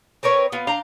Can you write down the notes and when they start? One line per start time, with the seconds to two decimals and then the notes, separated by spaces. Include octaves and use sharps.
0.23 C4 A#4 B4 C#5
0.52 B3 F4
0.67 D4 F5 G5 A#5